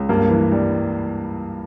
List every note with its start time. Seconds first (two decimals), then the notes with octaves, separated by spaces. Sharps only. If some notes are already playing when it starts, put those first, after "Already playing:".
Already playing: C#2
0.09 G2 A#3
0.30 E3
0.52 G3